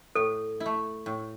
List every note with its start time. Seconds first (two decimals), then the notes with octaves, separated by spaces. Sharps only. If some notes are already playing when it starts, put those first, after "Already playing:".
0.15 A2 A4
0.60 E4
0.66 A3
1.06 A2